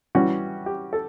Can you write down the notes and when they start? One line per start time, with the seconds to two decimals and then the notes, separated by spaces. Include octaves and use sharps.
0.15 E3 G3 C#4 F#4
0.66 G4
0.93 A4